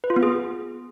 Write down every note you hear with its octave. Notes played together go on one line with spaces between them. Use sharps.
B4
F4
B3
G#4